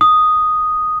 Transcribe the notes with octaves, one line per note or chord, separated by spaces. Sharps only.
D#6